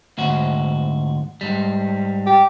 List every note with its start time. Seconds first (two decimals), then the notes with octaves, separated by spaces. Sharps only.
0.18 D2 G#2 F#4
1.41 G#2 G3
2.26 G4